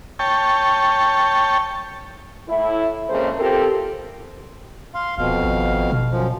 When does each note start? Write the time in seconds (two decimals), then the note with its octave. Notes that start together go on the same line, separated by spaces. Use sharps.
0.19 C#5 G5 A5
2.48 A2 E4
3.09 F2 C#3 G#3 A#3 C5
3.39 C4 F4 G4 A4 A#4
4.94 F5 C6
5.18 D#1 F2 B2 F5
5.44 G#1
5.92 B2
6.12 F#2 F3